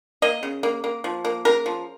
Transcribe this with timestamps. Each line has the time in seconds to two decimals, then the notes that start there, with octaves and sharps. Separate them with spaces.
0.22 A#3 D#5
0.43 C#3
0.63 A#3
0.84 A#3
1.04 F3
1.25 A#3
1.45 C#3 A#4
1.66 F3